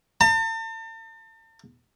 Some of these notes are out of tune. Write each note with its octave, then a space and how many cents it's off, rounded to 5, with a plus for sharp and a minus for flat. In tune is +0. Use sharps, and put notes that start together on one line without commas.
A5 +40